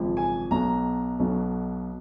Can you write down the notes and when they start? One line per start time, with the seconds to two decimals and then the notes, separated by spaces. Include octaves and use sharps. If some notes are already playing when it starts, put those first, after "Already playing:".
Already playing: G#1 F#2 C#3 F3
0.17 G#5
0.51 B1 B2 F#3 A#5
1.19 B1 B2 F#3